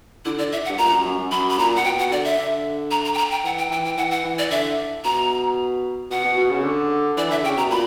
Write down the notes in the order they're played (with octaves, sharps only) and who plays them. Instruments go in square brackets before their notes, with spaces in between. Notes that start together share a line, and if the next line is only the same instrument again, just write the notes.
[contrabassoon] D3 [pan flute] E4
[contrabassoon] D3 [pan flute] D5
[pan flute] E5
F#5
[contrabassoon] G2
[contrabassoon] A#2 [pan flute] A#5
[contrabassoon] F#2
F#2
F#2
[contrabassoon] F#2 [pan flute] B5
[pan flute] B5
[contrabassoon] A#2 [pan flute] A#5
[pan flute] F#5
[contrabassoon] A#2
[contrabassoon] B2 [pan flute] G5
[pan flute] F#5
[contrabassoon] D3 [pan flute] D5
[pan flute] E5
[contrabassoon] D3
[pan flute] A#5
A#5
G5
A#5
G5
[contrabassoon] E3 [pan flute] F#5
[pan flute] G5
[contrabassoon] E3 [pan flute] G5
[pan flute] G5
[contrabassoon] E3 [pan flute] F#5
[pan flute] F#5
[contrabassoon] E3
[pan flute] D5
[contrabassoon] D3 [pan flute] E5
[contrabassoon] B2 [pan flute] A#5
[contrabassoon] B2 [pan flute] F#5
[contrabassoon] B2
B2
C#3
D3
[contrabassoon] E3 [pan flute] D5
[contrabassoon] D3 [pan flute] E5
[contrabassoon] C#3 [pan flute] G5
[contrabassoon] B2 [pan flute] A#5
[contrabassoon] A#2 [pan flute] B5